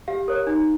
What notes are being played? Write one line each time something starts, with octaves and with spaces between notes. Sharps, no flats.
G4 F5
A#4 C#5
D#4